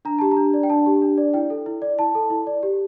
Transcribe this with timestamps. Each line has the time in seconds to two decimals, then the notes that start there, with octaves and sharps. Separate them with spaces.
0.05 D4 A#5
0.19 G4 A5
0.31 A#5
0.37 D4
0.54 D5
0.63 G5
0.70 D4 A5
0.86 G4
1.02 D4
1.18 D5
1.34 E4 G5
1.50 A4
1.66 E4
1.82 D5
1.99 E4 A5
2.15 A4
2.30 E4
2.47 D5
2.63 G4